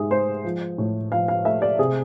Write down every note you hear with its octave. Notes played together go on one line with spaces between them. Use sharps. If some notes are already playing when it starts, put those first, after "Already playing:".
Already playing: G#2 G#3 G#4 E5
G#3 C5
F3
A2
F3 F5
F5
A3 E5
D5
C3 G#4